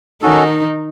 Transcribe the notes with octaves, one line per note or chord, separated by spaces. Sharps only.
D#3 C#4 D#4 F#4 A4